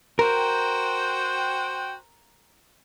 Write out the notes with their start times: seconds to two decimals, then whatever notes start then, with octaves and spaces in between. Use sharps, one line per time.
0.19 F#4 A#4 C5 G5